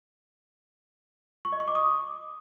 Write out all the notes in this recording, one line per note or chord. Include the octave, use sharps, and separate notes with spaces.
C#6
D#5
C#6
D6
D#6